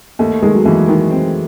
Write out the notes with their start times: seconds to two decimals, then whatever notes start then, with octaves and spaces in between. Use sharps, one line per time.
0.19 D#2 A3
0.42 D#3 G#3
0.55 F#3
0.65 D#2 E3
0.88 D#3
1.11 C4